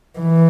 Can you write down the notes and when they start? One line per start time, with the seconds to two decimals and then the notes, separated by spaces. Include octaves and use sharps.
0.19 E3